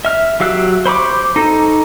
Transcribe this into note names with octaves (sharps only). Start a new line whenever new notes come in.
E5 F6
F#3 G4 F5 E6 F#6
C5 B5 C#6 D6
D#4 A4